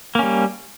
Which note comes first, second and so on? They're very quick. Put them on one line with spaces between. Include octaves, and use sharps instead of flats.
A#3 C#4 G3